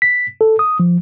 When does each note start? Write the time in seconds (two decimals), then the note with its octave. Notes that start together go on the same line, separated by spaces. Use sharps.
0.02 B6
0.41 A4
0.59 D#6
0.80 F3